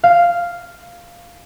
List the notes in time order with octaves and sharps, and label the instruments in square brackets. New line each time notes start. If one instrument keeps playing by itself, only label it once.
[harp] F5